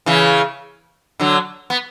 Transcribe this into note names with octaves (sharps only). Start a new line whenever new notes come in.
C#3 E3
D3 F#3
B3